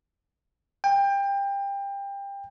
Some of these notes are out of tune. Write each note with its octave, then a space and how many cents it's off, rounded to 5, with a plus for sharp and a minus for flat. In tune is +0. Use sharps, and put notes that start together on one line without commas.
G5 +25